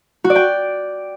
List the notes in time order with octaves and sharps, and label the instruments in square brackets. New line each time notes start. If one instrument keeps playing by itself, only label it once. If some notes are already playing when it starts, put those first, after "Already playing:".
[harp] F#4
D5
G5